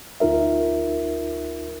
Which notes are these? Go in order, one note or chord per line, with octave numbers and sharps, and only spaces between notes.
D2 D#4 F4 A#4 E5